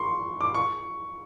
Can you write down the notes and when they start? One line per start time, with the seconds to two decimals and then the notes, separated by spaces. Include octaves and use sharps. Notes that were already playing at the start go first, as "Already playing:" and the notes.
Already playing: C6 C#6
0.41 D6
0.54 C#6